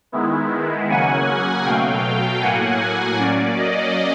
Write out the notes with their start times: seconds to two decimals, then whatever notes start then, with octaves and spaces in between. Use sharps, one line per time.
0.12 D#3 G#3 B3 E4
0.90 C#3 F#3 A#3 C#4 F#5 G#5
1.65 B2 F#3 A3 F5 G5
2.42 A2 F#3 A#3 F#5 G#5
2.81 F#5 G#5
3.18 F#3 A#3 C#4 D5
3.58 D#5